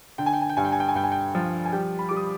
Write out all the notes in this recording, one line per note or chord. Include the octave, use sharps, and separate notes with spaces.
D3 G5
G#5
G5
G#5
G5
G2 G#5
G5
G#5
G5
G#5
G2 G5
G#5
G5
F3
G#5
G3 G5
B5
G3 D6
D#6